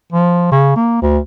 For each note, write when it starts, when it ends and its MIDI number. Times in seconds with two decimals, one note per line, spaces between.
0.13 0.50 53
0.51 0.76 49
0.76 1.01 58
1.02 1.18 38